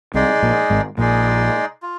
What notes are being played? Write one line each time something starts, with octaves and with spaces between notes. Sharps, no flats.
C2 C3 G#3 D#4 G#4 D5
A#1 A#2
G#1 G#2
A#1 A#2 G#3 D#4 G#4 D5
F4